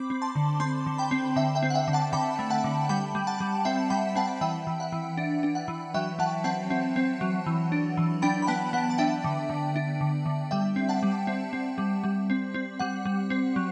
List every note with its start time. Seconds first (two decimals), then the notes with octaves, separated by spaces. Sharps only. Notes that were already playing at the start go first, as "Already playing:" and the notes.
Already playing: C4 B5 D6
0.10 C4
0.22 A5 C6
0.35 D3
0.60 C4 A5 C6
0.86 D3
0.98 G5 B5
1.11 C4
1.36 D3 E5 G5
1.55 E5 G5
1.63 C4
1.70 F#5
1.75 E5 G5
1.88 D3
1.93 F#5 A5
2.13 D3 G5 B5
2.39 A3
2.50 F#5 A5
2.64 D3
2.89 G3 G5 B5
3.15 G3
3.27 F#5 A5
3.40 G3
3.65 C4 E5 G5
3.90 G3 G5 B5
4.15 C4 F#5 A5
4.41 E3 E5 G5
4.67 E3
4.80 F#5
4.92 E3
5.17 D4
5.43 D4
5.55 F#5
5.68 E3
5.94 F#3 E5 G5
6.19 F#3 F#5 A5
6.44 C4 F#5 A5
6.70 C4
6.96 C4
7.21 F#3
7.46 E3
7.72 D4
7.97 E3
8.22 D4 G5 B5
8.42 B5
8.47 B3 F#5 A5
8.73 B3 F#5
8.90 A5
8.98 D4 E5 G5
9.24 D3
9.49 D3
9.76 D4
10.01 D3
10.26 D3
10.51 G3 E5 G5
10.76 C4
10.89 F#5 A5
11.03 G3
11.27 C4
11.53 C4
11.78 G3
12.04 G3
12.30 C4
12.54 C4
12.80 G3 F#5
13.05 G3
13.30 C4
13.56 F#3